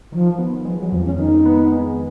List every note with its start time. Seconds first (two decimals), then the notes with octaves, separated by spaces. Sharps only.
0.12 D#3 F3
0.39 B3
0.65 F3 G#3
0.79 F#3
0.92 F2 F3
1.06 C#4
1.19 D#3 D#4
1.45 B3
1.72 G#3